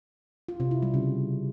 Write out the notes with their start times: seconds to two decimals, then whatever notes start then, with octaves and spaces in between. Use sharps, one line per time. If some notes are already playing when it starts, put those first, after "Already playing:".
0.48 F4
0.60 C3
0.71 E4
0.82 G3
0.94 C#3